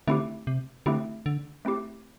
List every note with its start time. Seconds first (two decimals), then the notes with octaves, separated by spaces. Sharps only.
0.07 D3 A3 C4 E4 G4
0.47 C3
0.86 D3 A3 C4 E4 G4
1.26 D3
1.65 A3 C4 E4 G4